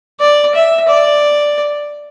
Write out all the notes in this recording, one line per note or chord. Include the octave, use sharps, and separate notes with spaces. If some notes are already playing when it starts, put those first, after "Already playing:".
D5
E5
D5